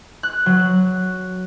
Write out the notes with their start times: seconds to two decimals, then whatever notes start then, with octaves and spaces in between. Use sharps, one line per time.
0.23 F#6
0.46 F#3